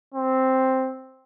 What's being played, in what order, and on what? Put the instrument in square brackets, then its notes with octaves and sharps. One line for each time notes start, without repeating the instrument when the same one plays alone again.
[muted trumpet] C4